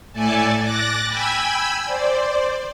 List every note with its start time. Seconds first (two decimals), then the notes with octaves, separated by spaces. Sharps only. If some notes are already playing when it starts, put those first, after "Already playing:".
0.13 A2 A3 A4 D5 G#5 A5
0.61 D6 F#6 A6 A#6
1.06 G5 G#5 B5 E6 G#6
1.85 C5 D5